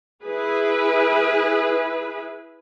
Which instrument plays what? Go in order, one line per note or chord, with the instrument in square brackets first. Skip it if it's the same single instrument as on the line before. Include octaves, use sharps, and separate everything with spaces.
[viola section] E4 G#4 B4